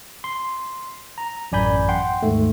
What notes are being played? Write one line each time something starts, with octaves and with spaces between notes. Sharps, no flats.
C6
A#5
A1 F#2 D5 G#5 B5 G6
F#5 G5 C6
D#2 G#2 A3